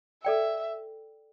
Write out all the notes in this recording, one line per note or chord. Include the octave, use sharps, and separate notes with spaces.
A4 D5 E5 G5